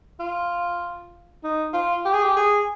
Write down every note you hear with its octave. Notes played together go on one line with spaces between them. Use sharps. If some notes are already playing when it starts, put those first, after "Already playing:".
F4
D#4
F4
G4
G#4
G4
G#4